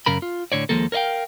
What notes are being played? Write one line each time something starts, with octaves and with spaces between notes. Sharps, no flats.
F#2 C#3 A#4 B5
F4
A2 D3 C#5 D5
D#2 A2 F3 G#3 A#3 A4
A#4 C#5 D#5 F5 G5